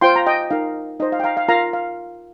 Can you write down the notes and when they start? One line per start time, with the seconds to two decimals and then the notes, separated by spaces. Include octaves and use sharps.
0.01 F4 C5 G5 C6
0.16 A#5
0.26 D#5 G5
0.50 D#4 A#4 F5
1.00 D#4 C5 D#5
1.12 F5
1.20 G5
1.24 F5 A#5
1.37 F5
1.49 F4 A#4 F5 A#5
1.73 F5